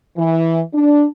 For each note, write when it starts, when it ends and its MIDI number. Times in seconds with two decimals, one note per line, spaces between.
0.17 0.60 52
0.74 1.06 62